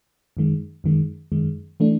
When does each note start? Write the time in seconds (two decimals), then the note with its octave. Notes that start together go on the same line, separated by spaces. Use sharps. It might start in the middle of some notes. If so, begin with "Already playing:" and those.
0.37 F#2 D#3 G#3
0.84 F#2 D#3 G#3
1.32 F#2 D#3 G#3
1.80 E3 A3 D4